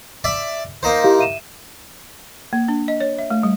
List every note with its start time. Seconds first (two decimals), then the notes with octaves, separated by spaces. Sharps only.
0.24 D5 E5
0.83 A#3 D#4 C5
1.04 E4 G4 F5
1.19 E5 D#7 E7
2.53 A#3
2.68 D4
2.88 D#5
3.00 C#5
3.19 E5
3.30 A3
3.43 G3